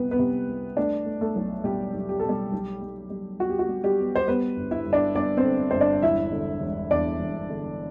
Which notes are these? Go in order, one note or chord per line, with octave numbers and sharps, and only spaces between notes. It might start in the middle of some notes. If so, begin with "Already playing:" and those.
Already playing: C2 C3 G3 B3 B4
B3 B4
C3
C2
A3 D4 D5
A3
A3 A4
B1
B2 G3 G4
B1
G4
B2 A4
G3 G4
B1
G3
G3
G3 F#4
G4
F#4
G3
G3 G4
B3
C5
G3 B3 B4
G1
E4 E5
G1
D4 D5
G1 D4 D5
C4 C5
D3
G1 C5
D4 D5
E1 E4 E5
D3
E1
E2 D4 D5
E1
D3